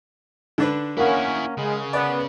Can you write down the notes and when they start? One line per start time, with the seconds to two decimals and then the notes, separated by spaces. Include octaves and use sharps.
0.58 D3 D4 B4
0.97 A#3 C#4 E4 G#4 A#4 F5 F#5
1.57 C#3 G#3
1.93 B3 D5